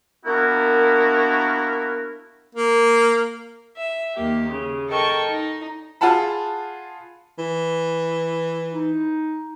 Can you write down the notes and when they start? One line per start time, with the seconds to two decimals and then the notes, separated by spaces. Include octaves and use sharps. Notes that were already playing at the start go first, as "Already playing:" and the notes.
0.25 A#3 B3 D4 E4 F#4 A#4
2.55 A#3
3.75 E5
4.14 D#2 A#3 G4
4.50 C#3
4.89 A4 A#4 D#5 G5 A5 C#6
5.27 D#4
6.01 F4 G#4 F#5 A5 B5
7.38 E3
8.72 D#4